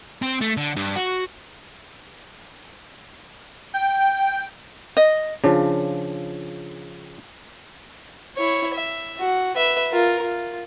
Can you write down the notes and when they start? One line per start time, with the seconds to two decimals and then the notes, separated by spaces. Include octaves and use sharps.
0.22 C4
0.41 A3
0.57 D3
0.76 G2
0.95 F#4
3.74 G5
4.97 D#5
5.44 C#3 F3 D4
8.37 E4 C#5
8.74 E5
9.20 F#4
9.56 B4 E5
9.92 F4 A#4
10.22 F4